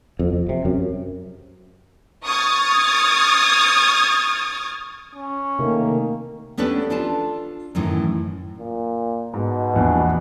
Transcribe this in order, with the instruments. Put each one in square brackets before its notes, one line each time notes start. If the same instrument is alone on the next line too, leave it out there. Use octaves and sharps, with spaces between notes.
[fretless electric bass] F2
F2
C3
F#2
[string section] C#6 D#6 F6 G#6 A6
[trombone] C#4
[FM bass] C3 [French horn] D#3 [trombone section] A3 A#3
[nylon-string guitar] B3 C#4 D4 G4 A4 B4
D4 F4 A4 A5
F#2 A2 D#3 E3
[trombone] A#2
[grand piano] G#2 [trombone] B2
[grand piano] A#1 E2 D4